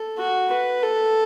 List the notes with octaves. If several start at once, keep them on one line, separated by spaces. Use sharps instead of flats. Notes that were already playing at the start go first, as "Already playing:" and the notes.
Already playing: A4
F#4
B4
A4